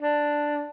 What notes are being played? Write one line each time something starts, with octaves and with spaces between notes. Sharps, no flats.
D4